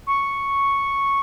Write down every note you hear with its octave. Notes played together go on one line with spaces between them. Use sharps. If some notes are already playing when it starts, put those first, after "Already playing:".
C#6